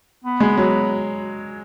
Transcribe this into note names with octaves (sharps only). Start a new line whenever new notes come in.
B3
G#3
F#3